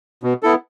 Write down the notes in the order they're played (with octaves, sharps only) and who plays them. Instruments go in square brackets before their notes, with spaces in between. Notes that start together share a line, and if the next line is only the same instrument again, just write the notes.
[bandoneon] B2
B3 E4 A4